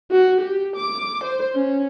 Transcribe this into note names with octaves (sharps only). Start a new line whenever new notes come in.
F#4
G4
D6
C5
C#4